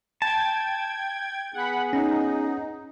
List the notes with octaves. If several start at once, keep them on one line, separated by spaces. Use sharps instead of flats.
G5 A5 G#6
B3 G#4 F#5 B5
C#4 D#4